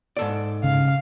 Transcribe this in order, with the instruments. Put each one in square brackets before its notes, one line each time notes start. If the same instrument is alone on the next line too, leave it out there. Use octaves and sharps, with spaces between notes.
[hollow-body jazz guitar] G#2 A4 D5
[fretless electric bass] C#3 [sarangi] F5